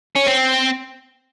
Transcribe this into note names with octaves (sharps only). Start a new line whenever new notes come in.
C#4
C4